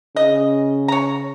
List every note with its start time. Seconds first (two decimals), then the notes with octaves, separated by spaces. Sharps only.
0.16 C#3 D#5
0.88 C#5 A#5